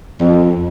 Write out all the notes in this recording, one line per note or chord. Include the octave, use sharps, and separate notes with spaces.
F2